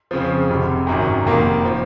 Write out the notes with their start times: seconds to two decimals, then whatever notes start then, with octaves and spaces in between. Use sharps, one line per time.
0.11 F2 C#3 F3
0.49 F1 F2 C3
0.87 G#1 F#2 D#3
1.25 F1 F2 D#3 A#3
1.65 F3